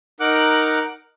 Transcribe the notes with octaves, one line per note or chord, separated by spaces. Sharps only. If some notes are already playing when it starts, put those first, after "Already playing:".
D#4 A#4 F#5 D6 F#6